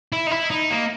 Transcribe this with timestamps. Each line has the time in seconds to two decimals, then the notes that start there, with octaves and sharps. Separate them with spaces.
0.13 E4
0.27 D#4
0.31 E4
0.51 D#4
0.71 A#3